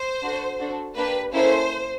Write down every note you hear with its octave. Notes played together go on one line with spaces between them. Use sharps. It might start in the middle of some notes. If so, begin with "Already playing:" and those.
Already playing: C5
D4 F#4 A4
D4 F#4 A4
A#3 D4 G4 B4
A#3 C#4 E4 A4 C5